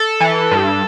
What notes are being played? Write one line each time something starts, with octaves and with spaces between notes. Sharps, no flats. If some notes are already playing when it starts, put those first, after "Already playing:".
Already playing: A4
E3
G2